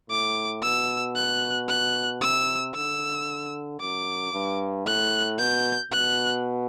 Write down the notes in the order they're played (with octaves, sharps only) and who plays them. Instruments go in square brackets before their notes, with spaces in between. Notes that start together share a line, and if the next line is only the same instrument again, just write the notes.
[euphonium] A2 [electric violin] D6
[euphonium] B2 [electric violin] E6
[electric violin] F#6
F#6
[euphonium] C3 [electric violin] E6
[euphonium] D3 [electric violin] E6
[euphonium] F#2 [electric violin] D6
[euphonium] G2
[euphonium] A2 [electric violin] F#6
[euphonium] B2 [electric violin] G6
[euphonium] B2 [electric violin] F#6